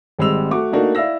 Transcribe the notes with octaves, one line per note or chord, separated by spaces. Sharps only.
G#1 G3 G#3 C4 E6 F7
A3 F#4 D6
A3 A#3 D4 D#4 F#4 A#4
E4 D5 F5 E6 A#6